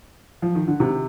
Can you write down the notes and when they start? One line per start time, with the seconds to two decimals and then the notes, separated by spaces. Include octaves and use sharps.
0.42 F3
0.55 D#3
0.68 D3
0.80 C3 D#3